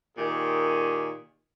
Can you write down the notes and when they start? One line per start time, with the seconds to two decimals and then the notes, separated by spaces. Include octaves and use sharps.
0.18 A#2 D#3 G4 G#4